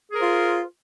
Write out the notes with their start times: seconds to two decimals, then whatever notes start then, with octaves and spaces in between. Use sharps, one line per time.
0.12 G#4
0.15 A#4
0.19 C5
0.22 F4